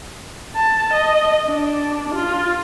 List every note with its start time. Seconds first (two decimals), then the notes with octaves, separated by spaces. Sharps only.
0.55 A5
0.93 D#5
1.47 D4
2.15 F4